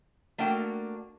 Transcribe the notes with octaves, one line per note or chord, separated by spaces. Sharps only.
A3 A#3 D4 F#4 G5